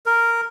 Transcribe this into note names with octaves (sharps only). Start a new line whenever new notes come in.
A#4